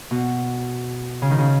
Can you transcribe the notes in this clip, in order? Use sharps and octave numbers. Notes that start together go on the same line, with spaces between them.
B2
C#3
D#3
C#3